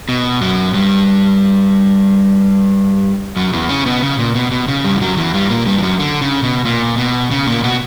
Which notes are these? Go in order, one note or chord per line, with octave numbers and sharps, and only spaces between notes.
B2
F#2 F#3
G2 G3
F#2 F#3
E2 E3
C#3 C#4
B2 B3
C#3
A#2
B2
B2
C#3
G2 G3
E3
F#2 F#3
E2 E3
G2 G3
A#2 A#3
G2 G3
E3
F#2 F#3
D3
C#3
B2
A#2
B2
C#3
A#2 A#3
B2 B3